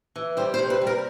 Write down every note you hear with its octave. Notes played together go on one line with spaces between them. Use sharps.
E3
G3 C5
C5
C3
B4
G3
A#4